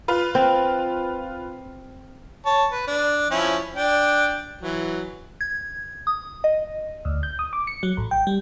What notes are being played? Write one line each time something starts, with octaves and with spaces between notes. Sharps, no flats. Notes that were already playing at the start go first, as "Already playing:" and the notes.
F4 B4
C4
C#5 A5
B4
D4
F3 C#4 E4
D4 G5
E3 F#3
G#6
D#6
D#5
D2
G6
D#6
D6
C#7
F#3
A1
G5
G3